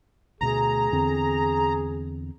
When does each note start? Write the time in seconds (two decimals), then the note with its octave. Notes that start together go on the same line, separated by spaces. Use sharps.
0.41 D2 B2 A3 G#4 A#5
0.92 E2 D3 C4